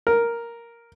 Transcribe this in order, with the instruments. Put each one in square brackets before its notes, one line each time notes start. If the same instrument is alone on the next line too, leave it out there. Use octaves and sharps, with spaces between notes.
[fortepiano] A#4